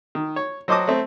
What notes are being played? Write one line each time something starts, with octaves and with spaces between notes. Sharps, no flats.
D#3
C#5
F#3 C5 D#5 A5 D6 D#6
A3 C4